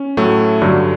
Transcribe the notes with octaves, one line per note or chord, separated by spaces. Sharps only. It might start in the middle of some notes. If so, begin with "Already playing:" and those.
Already playing: C#4
A2 F#3 A3
G2 D3 F#3